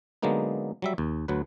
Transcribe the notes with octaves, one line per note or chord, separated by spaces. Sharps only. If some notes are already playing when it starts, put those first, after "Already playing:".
D3 F#3 G#3 A#3 B3 D#4
F#3 G3 E5
D#2
D2 F#3 B4